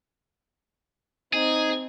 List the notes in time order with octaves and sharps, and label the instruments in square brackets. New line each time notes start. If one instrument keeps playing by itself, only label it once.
[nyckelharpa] C4 [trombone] D#4 [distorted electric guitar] G#4